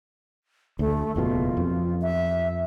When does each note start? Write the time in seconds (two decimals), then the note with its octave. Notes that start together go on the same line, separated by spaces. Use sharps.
0.79 D2 A3
1.16 F#1 E2 B2 F4
1.57 F2
2.02 E5